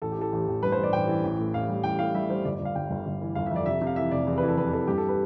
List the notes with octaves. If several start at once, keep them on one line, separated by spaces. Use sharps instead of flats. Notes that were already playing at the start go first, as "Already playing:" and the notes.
A1 A4
G4
E3 A4
A1
A1
G2 B4
C5
A1
D5
A1 G5
E3
A1
A2
A1 F5
G3
A1 G5
A2 F5
G3 E5
G3 C5
G1 D5
D5
G1
F5
G1 G5
G1
G1
E3
G1 F5
E5
F2 D5
C3 E5
C3
F5
E3 E5
F1 D5
E2
B4
E3
A4
F1 B4
E3 A4
G2 G4
A4
B4